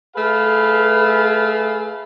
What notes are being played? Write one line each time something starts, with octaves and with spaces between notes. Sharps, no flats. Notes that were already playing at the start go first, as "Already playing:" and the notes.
A3 G#4 B4 F5